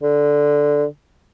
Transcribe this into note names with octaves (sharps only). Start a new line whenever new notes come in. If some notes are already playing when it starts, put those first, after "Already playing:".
D3